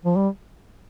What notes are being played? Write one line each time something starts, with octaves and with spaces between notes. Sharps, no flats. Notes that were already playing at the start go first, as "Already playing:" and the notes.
F3
G3